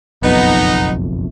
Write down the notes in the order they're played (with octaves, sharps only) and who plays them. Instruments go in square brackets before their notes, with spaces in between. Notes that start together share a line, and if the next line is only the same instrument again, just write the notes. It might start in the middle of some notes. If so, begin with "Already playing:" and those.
[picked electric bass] F#1 B1 F2 [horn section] B3 D#4